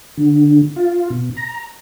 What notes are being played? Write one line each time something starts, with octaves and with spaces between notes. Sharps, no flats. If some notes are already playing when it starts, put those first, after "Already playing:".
D3
F4
B2
A#5